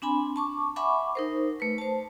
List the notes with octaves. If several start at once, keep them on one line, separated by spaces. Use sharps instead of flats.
C4 D4 G#5 B5
A5 C#6 D6
E5 F#5 G#5 B5 C#6 D6
D#4 A#4 C5
A3 B4
C5 A5